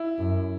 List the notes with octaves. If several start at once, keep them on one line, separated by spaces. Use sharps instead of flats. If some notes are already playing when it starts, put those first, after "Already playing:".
Already playing: E4
F#2